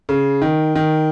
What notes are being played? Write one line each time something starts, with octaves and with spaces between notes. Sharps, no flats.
C#3
D#3
D#3